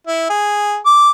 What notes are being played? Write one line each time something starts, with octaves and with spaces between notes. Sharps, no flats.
E4
G#4
D6